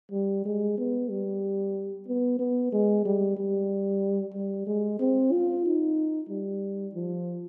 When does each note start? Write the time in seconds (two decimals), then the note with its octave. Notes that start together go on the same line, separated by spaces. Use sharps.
0.12 G3
0.45 G#3
0.78 B3
1.10 G3
2.07 B3
2.39 B3
2.72 G#3
3.05 G3
3.37 G3
4.34 G3
4.67 G#3
5.00 C4
5.32 F4
5.65 D#4
6.29 G3
6.94 F3